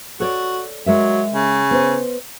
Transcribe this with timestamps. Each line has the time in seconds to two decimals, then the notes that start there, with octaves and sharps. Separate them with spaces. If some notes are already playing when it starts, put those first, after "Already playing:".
0.20 F#4 A4 C#5 D5
0.86 F#3 G#3 A#4 E5
1.34 C#3
1.71 B3 C5